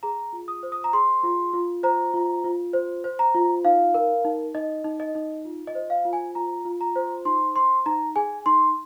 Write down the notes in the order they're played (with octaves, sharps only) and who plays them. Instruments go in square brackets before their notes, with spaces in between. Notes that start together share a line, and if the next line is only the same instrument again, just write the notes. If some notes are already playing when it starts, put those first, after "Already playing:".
[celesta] G#4 A#5
F4
D#6
C5
D#6
A#5
G#4 C6
F4
F4
C5 A#5
F4
F4
C5
C5
A#5
F4
D#4 F5
A#4
D#4
D#4 D#5
D#4
D#5
D#4
F4
D#5
C5
F5
F4
G#5
F4 A#5
F4
A#5
C5
D#4 C6
C5 C6
D#4 A#5
G#4 G#5
D#4 C6